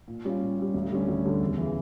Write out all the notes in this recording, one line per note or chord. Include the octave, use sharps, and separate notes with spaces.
A#2
G3 C#4 F4
A#2
G3 C#4 F4
D2
D3 G3 C#4
D2
D3 G3 C#4
E2
C#3 E3